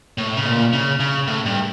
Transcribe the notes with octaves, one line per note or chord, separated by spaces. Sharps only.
A2
C#3
A#2
C#3
C#3
A2
G2